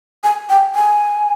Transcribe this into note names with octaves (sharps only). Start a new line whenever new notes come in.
G#5
G5
G#5